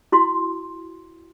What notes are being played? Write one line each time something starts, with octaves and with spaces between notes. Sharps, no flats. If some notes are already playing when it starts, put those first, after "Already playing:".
E4 F#4 C6